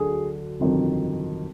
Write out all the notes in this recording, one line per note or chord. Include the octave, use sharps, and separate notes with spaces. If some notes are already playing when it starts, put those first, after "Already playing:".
Already playing: D2 D3 F#3 G#4
G1 F2 C3 D#3 F#3